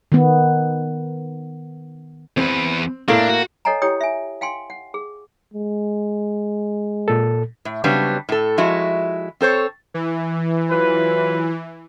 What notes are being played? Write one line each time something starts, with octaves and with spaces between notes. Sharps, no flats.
D#3 B3
E2 C4 B4
A2 A3 A#3 D4
F#4
A4 C#5 D#5 F#5 G#5 A#5
E4 G4 C#5 G5 D#6
E5 G#5
F5 G5 G#5 C6
F#5
G#4
G#3
A#2 A4
A2
C#3 F#3 G3 B3 C4 D4
A2 A4
F3 G#3 E4 F#4
C4 A4 C5 C#5
E3
F#3 F4 B4